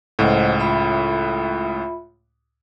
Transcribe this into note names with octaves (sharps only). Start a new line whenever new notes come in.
C#2 A2 C5 D#5 F#5
F4 E5 B5